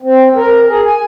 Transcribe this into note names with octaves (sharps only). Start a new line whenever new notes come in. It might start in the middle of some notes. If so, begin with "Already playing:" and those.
C4
A#4
G#4
G#5